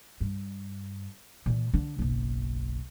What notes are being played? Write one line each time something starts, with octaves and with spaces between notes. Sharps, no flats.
G2
A#2 E3
D3 D4
F#1 B1